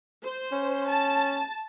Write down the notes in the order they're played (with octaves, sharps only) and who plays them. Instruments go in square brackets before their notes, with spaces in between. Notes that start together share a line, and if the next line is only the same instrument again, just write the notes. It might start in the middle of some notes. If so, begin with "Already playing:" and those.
[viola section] C5
[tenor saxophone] C#4
[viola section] A5